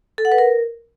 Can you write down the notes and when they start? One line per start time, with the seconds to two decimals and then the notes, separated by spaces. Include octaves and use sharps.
0.18 A4
0.25 F#5
0.32 B4
0.38 A#4